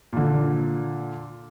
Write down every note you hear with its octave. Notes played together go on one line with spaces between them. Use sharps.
A#2 D3